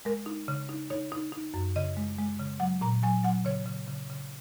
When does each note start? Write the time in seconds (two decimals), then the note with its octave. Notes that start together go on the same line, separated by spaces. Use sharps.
0.05 G#3 A#4
0.26 D#4
0.48 C#3
0.69 D#4
0.90 D#4 C#5
1.12 D#4
1.32 D#4
1.54 F#2
1.76 C#3 D#5
1.97 G#3
2.18 G#3
2.39 C#3
2.60 F#3 F#5
2.81 A#2 A#5
3.03 F#3 G#5
3.23 F#3 F#5
3.45 C#3 C#5
3.66 C#3
3.88 C#3
4.09 C#3